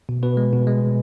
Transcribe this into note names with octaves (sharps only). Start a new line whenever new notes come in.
B2
B2 B4
G#3
B2
G#3